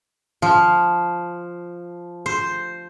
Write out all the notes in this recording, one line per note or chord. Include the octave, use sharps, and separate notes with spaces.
F3
C5